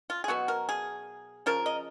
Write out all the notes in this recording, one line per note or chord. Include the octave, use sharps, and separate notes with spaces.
F4
G#4
B2 F#3 B3 F#4
A#4
G#4
C#3 F3 A#4
D#5